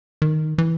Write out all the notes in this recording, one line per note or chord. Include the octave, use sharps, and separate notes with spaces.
D#3
E3